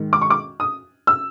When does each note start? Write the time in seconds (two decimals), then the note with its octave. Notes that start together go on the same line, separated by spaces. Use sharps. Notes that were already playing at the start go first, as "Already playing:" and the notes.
Already playing: G#2 D#3
0.13 D6
0.21 C#6
0.30 D6
0.60 D#6
1.07 E6